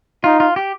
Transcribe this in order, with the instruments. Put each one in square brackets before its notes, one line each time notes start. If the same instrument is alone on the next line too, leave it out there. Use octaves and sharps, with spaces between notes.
[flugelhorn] D#4 [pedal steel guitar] F4
[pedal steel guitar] F4
G4